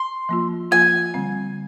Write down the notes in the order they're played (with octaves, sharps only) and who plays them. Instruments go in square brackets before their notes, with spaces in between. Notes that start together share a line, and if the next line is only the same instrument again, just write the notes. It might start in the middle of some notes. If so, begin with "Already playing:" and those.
Already playing: [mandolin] C6
[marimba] F3 A#3 F4
[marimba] F3 A#3 F4 [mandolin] G#5
[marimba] D3 G3 C4